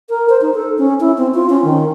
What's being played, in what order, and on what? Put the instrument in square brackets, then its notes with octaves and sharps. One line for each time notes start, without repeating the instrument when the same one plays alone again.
[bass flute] A#4
C5
D#4
A4
C#4
E4
C4
F4
C#4
D#3